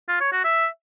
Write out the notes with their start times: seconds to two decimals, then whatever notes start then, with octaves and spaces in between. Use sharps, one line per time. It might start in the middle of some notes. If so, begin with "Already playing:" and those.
0.09 F4
0.20 C#5
0.32 F#4
0.44 E5